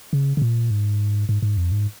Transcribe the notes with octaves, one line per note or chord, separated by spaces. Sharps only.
C#3
C#3
A#2
G#2
G#2
G#2
F2
G#2